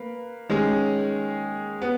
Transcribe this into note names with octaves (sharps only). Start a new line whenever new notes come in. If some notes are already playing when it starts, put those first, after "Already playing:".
Already playing: A#3 B4
D#3 G#3 C#4 G#4
B3